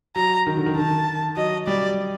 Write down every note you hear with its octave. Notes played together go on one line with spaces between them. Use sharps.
F#3 A#5
D#3
D3
D#3
D#3 A5
F#3 D#5
G3 D5